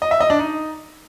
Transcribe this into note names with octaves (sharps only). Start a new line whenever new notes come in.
D#5
E5
D#5
D4
D#4